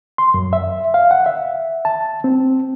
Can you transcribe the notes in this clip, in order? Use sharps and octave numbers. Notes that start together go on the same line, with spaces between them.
C6
F#2
E5
F5
F#5
E5
A5
C4